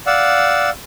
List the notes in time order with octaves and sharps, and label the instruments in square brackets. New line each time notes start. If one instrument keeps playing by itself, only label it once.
[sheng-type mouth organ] D5 F5 F#5 E6